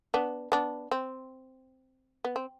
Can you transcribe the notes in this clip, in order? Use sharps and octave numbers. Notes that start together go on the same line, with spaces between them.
B3 D4
B3 D4
C4
B3
C4